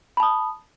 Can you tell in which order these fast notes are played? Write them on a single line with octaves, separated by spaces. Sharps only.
B5 A5 D#6